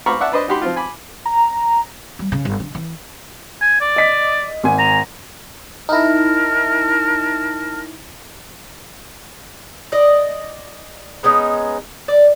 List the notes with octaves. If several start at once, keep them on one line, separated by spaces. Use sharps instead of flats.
C5 F5 A#5 B5 C#6 D6
D5 E5 F#5 A5
D4 B4 C5 D#5
D#4 F#4 G4 B5 C6 D6
F3 C4 F4
G#5 B5 D6
A#5
G3
C#3
G1
D3
E3
G#5
D5
D#5 B6
G#1 G#5
A#5
D#4 E4 A#4 A5 F6
D5 D#5
G#3 B3 C#4 D#4
D5